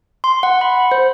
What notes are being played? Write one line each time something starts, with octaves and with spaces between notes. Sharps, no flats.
C6
F#5
B5
C5